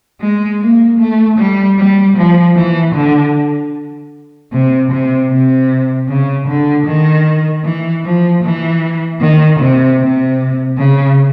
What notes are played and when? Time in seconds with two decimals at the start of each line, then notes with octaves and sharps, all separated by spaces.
0.21 G#3
0.61 A#3
1.00 A3
1.38 G3
1.78 G3
2.17 F3
2.56 E3
2.95 D3
4.52 C3
4.91 C3
5.31 C3
6.08 C#3
6.47 D3
6.86 D#3
7.65 E3
8.04 F3
8.43 E3
9.21 D#3
9.60 C3
10.00 C3
10.77 C#3